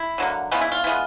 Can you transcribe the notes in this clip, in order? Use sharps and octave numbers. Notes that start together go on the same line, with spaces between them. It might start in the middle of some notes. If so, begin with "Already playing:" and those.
Already playing: E4
D3 F#3 A#3
C#3 E3 G#3 B3 F4
E4
F4
E3 G#3 B3